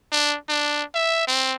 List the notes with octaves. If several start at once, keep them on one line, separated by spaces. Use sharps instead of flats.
D4
D4
E5
C4